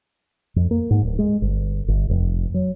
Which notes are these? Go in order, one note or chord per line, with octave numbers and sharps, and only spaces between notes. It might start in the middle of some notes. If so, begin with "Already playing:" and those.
F2
A#3
G#2
D1
G#3
G1
G1
F1
F#3